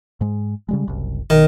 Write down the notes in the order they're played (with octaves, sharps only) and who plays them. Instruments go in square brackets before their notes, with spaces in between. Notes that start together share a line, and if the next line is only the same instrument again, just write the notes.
[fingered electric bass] G#2 G#3
C#3 G3 G#3
F#1 C2
[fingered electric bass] B1 [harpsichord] D#3